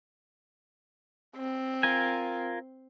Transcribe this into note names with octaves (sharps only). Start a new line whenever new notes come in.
C4
F4 A#4 G#5